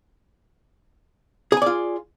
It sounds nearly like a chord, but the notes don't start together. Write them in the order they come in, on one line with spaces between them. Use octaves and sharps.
G#4 G#5 D5 F4